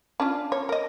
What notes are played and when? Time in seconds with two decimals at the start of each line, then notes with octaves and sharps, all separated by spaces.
0.20 C#4 D4 F4
0.52 C#5
0.69 A#4 D#5